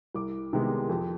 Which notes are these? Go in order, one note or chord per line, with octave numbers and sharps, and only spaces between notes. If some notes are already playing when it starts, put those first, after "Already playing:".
C2 D6
C3 D#3 G#3 B3
F2